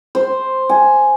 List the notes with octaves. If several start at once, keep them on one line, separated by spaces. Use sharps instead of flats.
C5
G#5